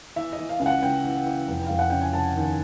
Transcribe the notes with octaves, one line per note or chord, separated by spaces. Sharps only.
E3 E5
D#5
E3
F5
C#2 F5
F#5
C#2 G5
E3
E3
F1
F1 F5
F#5
C#3 G5
G#5
F1 A5
D#2